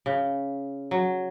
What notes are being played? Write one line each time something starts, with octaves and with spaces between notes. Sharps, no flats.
C#3
F#3